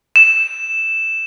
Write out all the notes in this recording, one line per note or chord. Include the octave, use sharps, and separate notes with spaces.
E7